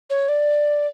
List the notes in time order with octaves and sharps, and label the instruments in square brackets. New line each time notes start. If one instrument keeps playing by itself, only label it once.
[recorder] C#5
D5